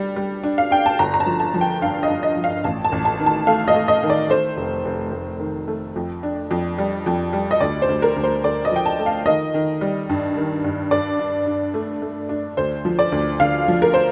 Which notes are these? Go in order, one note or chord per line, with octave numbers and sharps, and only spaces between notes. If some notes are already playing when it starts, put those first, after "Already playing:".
Already playing: G3 D4
G3
D4
F5
D4 G5
A5
G1 A#5
A#5
A5
F3
A5
F3
G5
G2 F5
D#5
G2
D#5
F3
F5
A1 A5
A5
A1
A5
D#3
A5
A3 F5
D#5
A3
D#5
D#3
D5
A3 C5
F1
F1
F1
D#3
A3
F2
D4
F2
G3
F2
G3
D#5
D2 D5
C5
D2
A#4
D2
C5
D2 D5
D#5
F3 G5
A5
A3
F5
D#3 D#5
D#3
G3
G2
D#3
G2
G2 D5
D4
D4
A3
A3
D4
D2 C5
F3
D5
D2
D3 F5
F3
A#4
C5